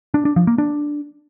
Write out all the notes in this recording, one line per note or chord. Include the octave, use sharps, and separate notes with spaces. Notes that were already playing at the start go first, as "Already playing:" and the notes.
D4
D4
F3
A#3
D4